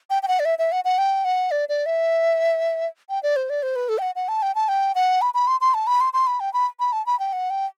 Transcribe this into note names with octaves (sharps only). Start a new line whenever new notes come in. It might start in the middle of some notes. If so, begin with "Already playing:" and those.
G5
G5
F#5
D5
E5
E5
F#5
F#5
G5
F#5
D5
D5
E5
G5
D5
C5
D5
C5
B4
A4
G5
F#5
F#5
A5
G5
A5
G5
F#5
B5
B5
C6
C6
A5
B5
C6
C6
B5
G5
B5
B5
A5
B5
G5
F#5
G5